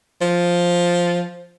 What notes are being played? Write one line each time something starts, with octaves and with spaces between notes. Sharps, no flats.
F3